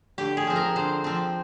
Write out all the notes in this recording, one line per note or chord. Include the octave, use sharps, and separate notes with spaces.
D3 G4
G#4
F3 C4
A#4
D3 C5
F3 C4